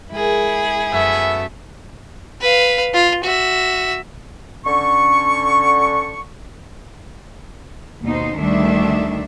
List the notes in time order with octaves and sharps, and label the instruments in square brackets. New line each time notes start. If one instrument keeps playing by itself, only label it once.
[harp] G#3 A#4 [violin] E4 G#4
[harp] F#2 [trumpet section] A3 B3 E5
[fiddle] B4 F5
F4
F#4 E5
[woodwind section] D3 C#4 C#6
[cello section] D#2 B2 D#4 C5
D2 D#3 G3 D4 E5